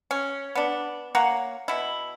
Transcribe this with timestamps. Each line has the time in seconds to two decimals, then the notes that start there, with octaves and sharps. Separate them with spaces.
0.11 C#4
0.55 B3 D4
1.15 A#3 C#5 F#5 A#5
1.68 B2 E4